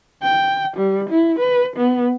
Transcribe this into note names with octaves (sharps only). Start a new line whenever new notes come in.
G5
G3
E4
B4
B3